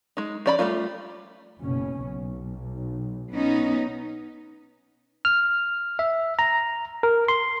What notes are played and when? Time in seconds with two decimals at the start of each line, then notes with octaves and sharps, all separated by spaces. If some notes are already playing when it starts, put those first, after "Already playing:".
0.17 G#3 D#4
0.46 F3 C#4 D5 A#5 B5
0.59 G3 A3 C#4 F4
1.62 F#1 B2 C#4
2.04 B1
3.32 B3 C#4 D#4
5.25 F6
5.99 E5
6.39 A#5
7.03 A#4
7.28 C6